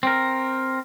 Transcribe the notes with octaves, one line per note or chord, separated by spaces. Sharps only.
C4 A#4